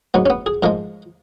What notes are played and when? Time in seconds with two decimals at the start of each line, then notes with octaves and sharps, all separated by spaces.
0.14 G#2 F#3 B3
0.26 C#4
0.30 B3
0.46 G#4
0.63 G#2 F3 G#3 A#4